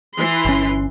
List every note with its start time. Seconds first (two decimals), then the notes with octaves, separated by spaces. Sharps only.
0.15 E3 C6
0.45 G1 C#4